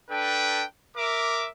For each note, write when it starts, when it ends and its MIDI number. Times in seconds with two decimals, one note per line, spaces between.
0.10 0.64 62
0.10 0.64 69
0.10 0.64 71
0.10 0.64 79
0.97 1.48 70
0.97 1.48 76
0.97 1.48 86